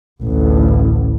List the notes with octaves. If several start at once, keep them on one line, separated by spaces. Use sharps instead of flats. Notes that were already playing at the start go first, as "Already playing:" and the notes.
A1 D2